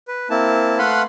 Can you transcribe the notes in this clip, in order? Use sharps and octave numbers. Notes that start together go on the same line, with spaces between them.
B4
A#3 C4 E4 A5
A3 B4 F5 F#5 B5 C6